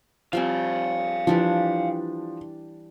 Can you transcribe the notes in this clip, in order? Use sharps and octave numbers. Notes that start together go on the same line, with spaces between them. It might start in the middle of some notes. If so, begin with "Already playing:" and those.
F3 G3 C4 F5 G#5
E3 F3 G3 D4